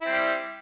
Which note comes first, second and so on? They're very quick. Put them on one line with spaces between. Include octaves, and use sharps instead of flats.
E4 C4 G3